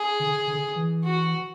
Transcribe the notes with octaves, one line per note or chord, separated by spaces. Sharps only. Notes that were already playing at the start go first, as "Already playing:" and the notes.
Already playing: G#4
D3
D3
E3
F#4